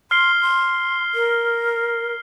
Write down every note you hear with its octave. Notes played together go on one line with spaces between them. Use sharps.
C6 F6 C7 G7
C6
A#4